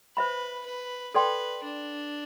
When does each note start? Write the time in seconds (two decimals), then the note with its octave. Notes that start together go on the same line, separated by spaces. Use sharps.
0.17 B4 C5 E5 B5
0.66 B4
1.15 A4 B4 D5 G5 C6
1.64 D4